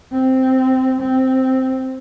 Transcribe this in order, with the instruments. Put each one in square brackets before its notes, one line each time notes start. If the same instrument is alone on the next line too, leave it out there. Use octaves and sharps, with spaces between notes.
[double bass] C4
C4